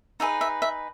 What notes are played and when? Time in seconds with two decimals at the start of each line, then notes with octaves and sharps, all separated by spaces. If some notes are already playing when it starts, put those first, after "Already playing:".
0.20 D#4 G#4 B4 E5
0.41 E5
0.62 E5